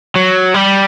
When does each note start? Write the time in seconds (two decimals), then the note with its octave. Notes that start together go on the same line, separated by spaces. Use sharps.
0.16 F#3
0.54 G3